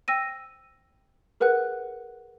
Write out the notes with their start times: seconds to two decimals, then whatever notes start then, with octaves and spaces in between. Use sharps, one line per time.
0.08 G5 E6 A#6 D#7
1.40 G#4 A#4 B4 F#5 F#6